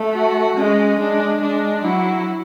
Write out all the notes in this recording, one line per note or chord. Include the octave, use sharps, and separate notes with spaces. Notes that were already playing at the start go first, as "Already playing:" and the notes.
Already playing: A3
F#4
G#3 C#4
G#3 D4
G#3 D4
F#3 E4